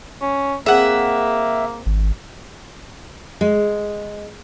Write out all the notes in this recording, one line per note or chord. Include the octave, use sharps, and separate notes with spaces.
C#4
A#3 C4 G#4 E5 F#5
G#1
G#3